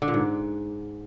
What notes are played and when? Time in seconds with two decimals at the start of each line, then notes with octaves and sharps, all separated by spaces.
0.02 D3
0.08 A#2
0.14 G#2